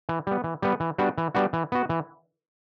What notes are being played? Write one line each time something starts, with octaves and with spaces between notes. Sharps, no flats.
E3
G3 B3
E3
G3 B3
E3
G3 B3 D4 F#4
E3
G3 B3 D4 F#4
E3
B3 F#4
E3